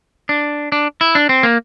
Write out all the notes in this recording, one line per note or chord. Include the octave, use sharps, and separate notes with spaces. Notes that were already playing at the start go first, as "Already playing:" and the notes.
D4
D4
E4
D4
C4
A#3